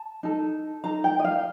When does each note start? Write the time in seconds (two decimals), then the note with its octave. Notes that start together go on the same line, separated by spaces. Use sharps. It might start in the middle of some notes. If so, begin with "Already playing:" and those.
Already playing: A5
0.23 D#4 A4
0.84 D#4 A4 A#5
1.04 G5
1.19 D#5
1.25 F5